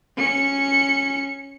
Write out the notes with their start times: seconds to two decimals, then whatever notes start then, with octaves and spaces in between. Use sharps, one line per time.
0.17 C#4 C#7